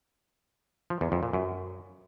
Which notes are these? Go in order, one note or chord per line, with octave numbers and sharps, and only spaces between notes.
F3
E2
F2
A#2
F#2